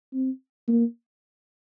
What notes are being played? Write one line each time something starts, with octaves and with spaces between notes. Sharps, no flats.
C4
A#3